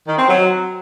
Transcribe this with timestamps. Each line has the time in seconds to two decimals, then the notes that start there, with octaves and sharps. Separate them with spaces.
0.08 D#3
0.18 C4
0.28 F#3